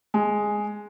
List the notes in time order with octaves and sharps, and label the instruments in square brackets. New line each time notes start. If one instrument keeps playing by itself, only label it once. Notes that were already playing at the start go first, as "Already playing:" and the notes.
[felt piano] G#3